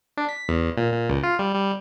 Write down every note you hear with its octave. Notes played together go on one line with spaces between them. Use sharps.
D4
B6
E2
A#2
A#2
C#2
F4
G3
G3